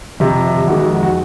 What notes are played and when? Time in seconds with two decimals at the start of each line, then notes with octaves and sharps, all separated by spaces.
0.20 F2 C3 F3
0.67 F2 D#3 G#3 F#4
0.79 F#4
1.03 F#4